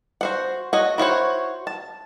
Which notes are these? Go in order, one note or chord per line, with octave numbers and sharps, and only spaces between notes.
F#4 C5 F#5
F#4 C#5 D#5
E4 F#4 C5 C#5
A5